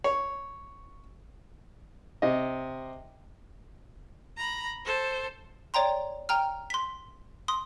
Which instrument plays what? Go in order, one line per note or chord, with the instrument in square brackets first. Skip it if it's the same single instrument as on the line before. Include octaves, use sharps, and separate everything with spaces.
[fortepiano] C#5
C3 D#5
[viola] A#5 B5
A4 C5
[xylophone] C#5 D5 G5 A#5 C6
G5 A#5 F6
C6 B6
C6 D#6